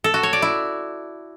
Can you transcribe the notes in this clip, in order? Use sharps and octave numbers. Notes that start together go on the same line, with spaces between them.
A4
F#4
C#5
D5
E4